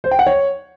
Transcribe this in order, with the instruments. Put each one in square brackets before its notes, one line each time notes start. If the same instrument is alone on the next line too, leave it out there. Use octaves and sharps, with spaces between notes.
[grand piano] C5
G5
F#5
C#5